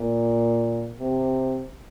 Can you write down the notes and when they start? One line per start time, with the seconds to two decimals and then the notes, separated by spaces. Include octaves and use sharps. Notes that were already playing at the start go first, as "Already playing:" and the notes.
Already playing: A#2
1.00 C3